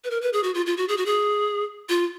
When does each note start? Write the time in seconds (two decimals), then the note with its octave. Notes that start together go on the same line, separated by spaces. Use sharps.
0.04 B4
0.10 A#4
0.21 B4
0.33 G#4
0.43 F#4
0.55 F4
0.66 F4
0.77 F#4
0.89 G#4
0.97 F#4
1.06 G#4
1.89 F4